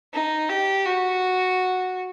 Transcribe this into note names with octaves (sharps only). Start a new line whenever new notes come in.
D#4
G4
F#4